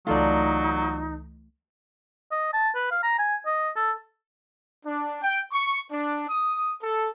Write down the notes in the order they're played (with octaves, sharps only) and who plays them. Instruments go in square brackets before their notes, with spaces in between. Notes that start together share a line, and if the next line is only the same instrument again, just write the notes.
[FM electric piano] C#2 E3 A3 [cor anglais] F#3 [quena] D#4 [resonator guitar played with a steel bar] F4 A4 D5
[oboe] D#5
A5
B4
F5
A#5
G#5
D#5
A4
[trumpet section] D4
G5
C#6
D4
D#6
A4